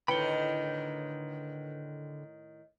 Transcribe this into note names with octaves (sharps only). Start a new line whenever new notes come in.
A2 D3 D#3 B4 G5 B5 C#7 G7